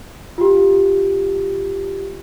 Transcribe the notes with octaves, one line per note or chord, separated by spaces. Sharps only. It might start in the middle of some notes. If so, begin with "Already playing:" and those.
F4 G4